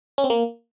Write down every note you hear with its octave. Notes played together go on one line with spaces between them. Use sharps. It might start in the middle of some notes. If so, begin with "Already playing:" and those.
C#4
C4
A#3